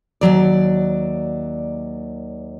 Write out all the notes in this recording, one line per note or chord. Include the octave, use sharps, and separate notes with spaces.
D#2 A#2 F#3 D5